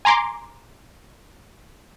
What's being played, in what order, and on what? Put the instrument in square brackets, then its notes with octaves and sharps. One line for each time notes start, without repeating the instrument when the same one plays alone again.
[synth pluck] G#5 A#5 C6 D6